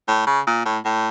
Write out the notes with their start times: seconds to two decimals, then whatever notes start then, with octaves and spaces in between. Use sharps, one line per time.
0.08 A2
0.27 C#3
0.47 A#2
0.65 A2
0.85 A2